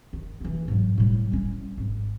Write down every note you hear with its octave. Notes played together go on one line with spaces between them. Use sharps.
D#3
E3 A#3
G#2 F#3
A2 G3
G3 C#4
G#1